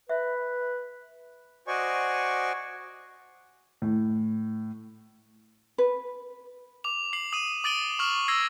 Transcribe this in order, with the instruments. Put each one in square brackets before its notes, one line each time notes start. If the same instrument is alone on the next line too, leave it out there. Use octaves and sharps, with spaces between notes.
[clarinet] B4 [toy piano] E5
[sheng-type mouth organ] F#4 C5 D5 D#5 G#5 C#6
[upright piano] A2
[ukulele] B4
[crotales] D6 F7
D6 C7 F#7
D#6 D#7
D6 D#6 A6 D7 D#7 G7
C#6 F6 F#7
E6 G#6 A#6 C7